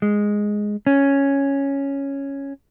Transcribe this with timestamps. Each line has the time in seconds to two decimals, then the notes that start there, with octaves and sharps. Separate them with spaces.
0.02 G#3
0.87 C#4